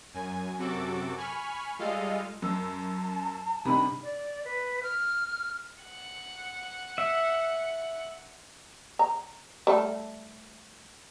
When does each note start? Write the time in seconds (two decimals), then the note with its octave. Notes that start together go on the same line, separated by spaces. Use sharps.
0.14 F#2 G#5
0.58 F#2 C3 F#4 A4 D6
1.17 G#5 B5 C#6 F6
1.79 G3 G#3 F4 A4 D#5 F5
2.42 F#2 A5 E6
3.65 G2 C3 D#3 B5
4.03 D5
4.45 B4
4.83 F6
5.83 F#5
6.98 E5
8.99 A#5
9.67 G3 A3 A4